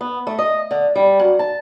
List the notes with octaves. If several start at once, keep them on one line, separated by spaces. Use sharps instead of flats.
B3
A3
D#5
D3
G3
F#2
A5